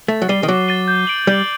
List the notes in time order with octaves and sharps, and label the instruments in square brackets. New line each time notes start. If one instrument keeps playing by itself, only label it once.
[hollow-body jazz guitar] A3 [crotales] A6
[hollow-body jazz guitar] F#3
[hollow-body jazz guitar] G3 [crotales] C7 D#7 G7
[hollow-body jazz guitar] D#3
[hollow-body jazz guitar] F#3 [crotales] D6
[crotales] A6 D#7 G7
G6
D7 F#7
[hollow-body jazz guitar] G3 [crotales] G6